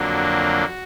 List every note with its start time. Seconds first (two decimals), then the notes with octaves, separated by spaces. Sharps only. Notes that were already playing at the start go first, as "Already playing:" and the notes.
Already playing: F2 D3 F#3 A#3 D4
0.22 F#4